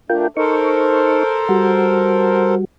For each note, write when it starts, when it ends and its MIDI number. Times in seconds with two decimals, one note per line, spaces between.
0.10 0.26 57
0.10 0.26 62
0.10 0.28 65
0.10 0.28 70
0.10 0.28 79
0.37 1.23 63
0.37 2.55 69
0.37 2.55 70
0.37 2.55 72
0.37 1.23 85
1.49 2.65 55
1.49 2.65 66